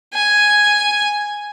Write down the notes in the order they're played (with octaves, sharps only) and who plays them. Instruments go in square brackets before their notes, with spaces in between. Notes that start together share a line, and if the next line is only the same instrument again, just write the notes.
[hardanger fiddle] G#5